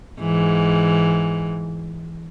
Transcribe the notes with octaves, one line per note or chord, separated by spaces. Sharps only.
G#2 E3